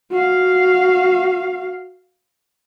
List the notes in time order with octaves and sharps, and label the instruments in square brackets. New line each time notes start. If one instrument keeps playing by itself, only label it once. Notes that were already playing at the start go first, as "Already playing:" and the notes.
[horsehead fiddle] F#4 F5